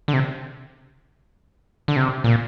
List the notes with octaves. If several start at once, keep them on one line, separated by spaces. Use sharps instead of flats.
D3
C3
D3
C3
A#2